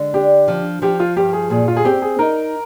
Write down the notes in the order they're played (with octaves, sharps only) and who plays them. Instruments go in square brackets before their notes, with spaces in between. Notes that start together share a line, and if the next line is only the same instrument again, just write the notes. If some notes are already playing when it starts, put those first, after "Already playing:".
Already playing: [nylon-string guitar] D3 G#3
[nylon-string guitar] D4 [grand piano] G4
[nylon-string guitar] F3
[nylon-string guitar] F3 [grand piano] G4
[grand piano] F4
[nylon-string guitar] G2 [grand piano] G4
[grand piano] G#4
[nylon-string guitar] A#2 [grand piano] G#4
[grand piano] F4
G#4
[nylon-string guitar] C4 [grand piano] G4
[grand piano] G#4
[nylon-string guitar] D#4 [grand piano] A#4